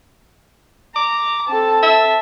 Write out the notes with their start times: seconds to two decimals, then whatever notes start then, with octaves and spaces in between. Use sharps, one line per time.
0.96 A#5 D6
1.48 C4 A4 A5
1.83 E5